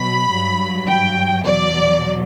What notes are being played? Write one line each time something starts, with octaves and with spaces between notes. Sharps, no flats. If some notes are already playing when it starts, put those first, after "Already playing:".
Already playing: B2 F#3 B5
G2 F#3
G5
E2 B2 F#3 D5